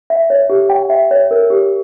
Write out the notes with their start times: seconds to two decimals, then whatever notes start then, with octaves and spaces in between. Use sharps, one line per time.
0.10 E5
0.30 C#5
0.50 G4
0.69 G5
0.90 E5
1.11 C#5
1.31 A#4
1.50 G4